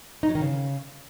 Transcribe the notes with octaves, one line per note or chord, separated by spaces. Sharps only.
D#4
F#3
D#3
C#3